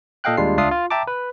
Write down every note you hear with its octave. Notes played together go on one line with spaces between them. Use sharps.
A#2 A4 D#5 F5 G5 F#6
D#2 G3 G#3 D4 F4 C7
C#2 D4 F4 E5 D#6 C7
F4
E5 G5 A5 A#5 D6
B4